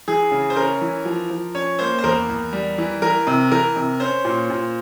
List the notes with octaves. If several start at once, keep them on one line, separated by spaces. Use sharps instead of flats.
E3 G#4
C#3
C5
C#4 A#4
E3
F3
F3
C#4 C#5
A#3 C5
C5
E2 A#4
E2
G3
E3
E3 A#4
C3
E3 A#4
C3
C#4 C5
A#2
A#2